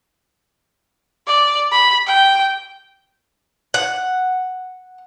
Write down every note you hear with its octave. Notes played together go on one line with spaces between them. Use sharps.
D5
B5
G5
F#5